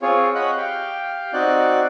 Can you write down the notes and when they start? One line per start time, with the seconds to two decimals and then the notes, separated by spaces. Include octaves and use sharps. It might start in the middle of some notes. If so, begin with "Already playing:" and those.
0.02 C4 F4 G#4 C#5
0.35 C#5 D#5 F#5 B5 F#6
0.57 G4 F5 G5
1.33 C4 D#4 F#4 D5 F#6